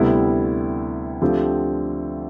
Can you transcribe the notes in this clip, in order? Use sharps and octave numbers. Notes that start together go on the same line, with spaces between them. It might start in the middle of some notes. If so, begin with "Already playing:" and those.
Already playing: D2 C3 G3 B3 E4
D2 D3 F3 C4 G4